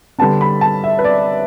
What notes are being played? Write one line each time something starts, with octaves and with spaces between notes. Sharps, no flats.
D3 G3 B3 D4 A5
B5
A5
E5
B4
D5